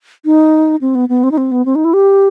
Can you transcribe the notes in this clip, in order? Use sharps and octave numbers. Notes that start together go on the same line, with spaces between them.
D#4
C4
B3
B3
C4
D#4
C4
B3
C4
D#4
E4
G4